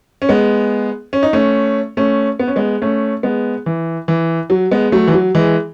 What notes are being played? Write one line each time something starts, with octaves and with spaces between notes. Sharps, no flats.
C#4
G#3 B3
C#4
D#4
A3 C#4
A3 C#4
B3
C#4
G#3 B3
A3 C#4
G#3 B3
E3
E3
F#3
G#3 B3
F#3 A3
E3
F#3
E3 G#3